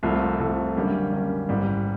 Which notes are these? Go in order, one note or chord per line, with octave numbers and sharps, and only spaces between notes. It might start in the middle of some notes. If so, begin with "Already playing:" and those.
C2 C3 F3 A3
C2 C3 F3 A3
F#2 D3 G3 A#3 C#4
F#2 D3 G3 A#3 C#4
A1 G#2 E3 G3